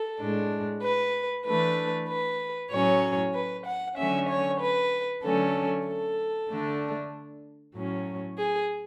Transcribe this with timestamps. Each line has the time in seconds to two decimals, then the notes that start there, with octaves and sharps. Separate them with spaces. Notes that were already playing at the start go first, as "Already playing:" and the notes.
Already playing: A4
0.20 A2 G#3 D4
0.82 B4
1.46 E3 A3 D4 B4
2.09 B4
2.71 A2 F#3 C#4 C#5
3.34 B4
3.66 F#5
3.97 D3 F#3 A3 C#4 E5
4.28 C#5
4.60 B4
5.23 D3 F#3 A3 C#4 A4
5.86 A4
6.49 D3 A3 D4
7.74 A2 F#3 C#4
8.38 G#4